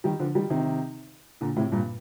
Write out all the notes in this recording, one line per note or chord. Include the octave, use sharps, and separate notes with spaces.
D#3 G3
D3 F3
D#3 G3
C3 D#3
A#2 D3
A2 C3
G2 A#2